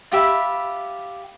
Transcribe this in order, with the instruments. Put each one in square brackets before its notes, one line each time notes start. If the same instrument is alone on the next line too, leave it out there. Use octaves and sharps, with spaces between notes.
[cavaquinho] F4 G4 E5 B5